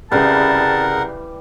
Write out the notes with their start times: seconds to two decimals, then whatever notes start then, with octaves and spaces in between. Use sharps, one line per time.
0.12 C2 C#3 E3 G3 A#4 F#5 A5